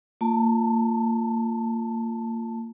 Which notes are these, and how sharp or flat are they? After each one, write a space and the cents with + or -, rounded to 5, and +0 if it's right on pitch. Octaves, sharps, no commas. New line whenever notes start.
A#3 -35 F4 +0 A5 +0